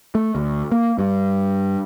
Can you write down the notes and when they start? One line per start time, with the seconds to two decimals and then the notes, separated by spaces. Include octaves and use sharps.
0.15 A3
0.35 D2
0.71 A#3
0.99 G2